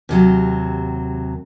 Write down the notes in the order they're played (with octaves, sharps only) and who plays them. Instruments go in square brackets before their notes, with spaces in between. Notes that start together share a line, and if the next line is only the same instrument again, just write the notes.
[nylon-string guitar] D#2 C3 F#3